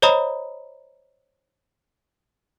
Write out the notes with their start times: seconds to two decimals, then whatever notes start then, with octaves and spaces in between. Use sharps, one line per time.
0.02 C5 C#5 D#5 A#5 B5 D#6